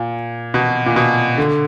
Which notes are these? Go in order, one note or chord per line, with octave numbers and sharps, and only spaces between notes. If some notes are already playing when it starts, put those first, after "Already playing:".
Already playing: A#2
B2
A#2
B2
D3